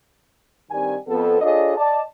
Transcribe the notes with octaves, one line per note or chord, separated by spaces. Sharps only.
G2 D#3 C4 G4 D5 G#5
F2 B3 A4
D4 F4 G#4 A4 C#5 D#5
D5 D#5 A5